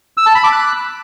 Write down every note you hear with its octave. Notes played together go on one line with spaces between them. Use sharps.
E6
A5
B5
D6
F#6